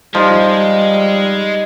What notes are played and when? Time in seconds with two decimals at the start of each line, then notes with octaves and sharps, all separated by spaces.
0.15 F3 G3 G#3 D#4